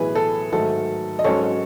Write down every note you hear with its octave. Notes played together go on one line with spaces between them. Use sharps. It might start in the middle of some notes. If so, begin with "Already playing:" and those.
Already playing: B1 A2 E3 G#4 B4
A4
G#2 D#3 F#3 A3 A4
D#5
G#1 G#2 F#3 C#4 A4 C#5